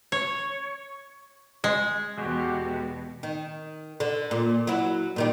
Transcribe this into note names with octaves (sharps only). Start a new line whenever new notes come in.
C#5
G#3
E2 B2 G#3 F#4 G4
D#3
D3
A#2
F#3 E4
A#2 D#3 G3